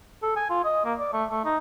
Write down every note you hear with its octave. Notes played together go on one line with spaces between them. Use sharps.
A4
G#5
F4
D#5
A#3
D5
A3
A3
D#4